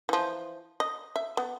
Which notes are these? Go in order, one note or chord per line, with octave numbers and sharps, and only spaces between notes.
E3 F3
D#5
E5
B3